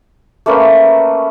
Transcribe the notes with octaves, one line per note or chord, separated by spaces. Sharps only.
A3 A#3 C#4 B4